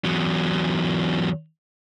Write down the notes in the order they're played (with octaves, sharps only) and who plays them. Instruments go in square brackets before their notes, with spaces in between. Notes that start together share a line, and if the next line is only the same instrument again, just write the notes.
[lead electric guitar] E2 F#3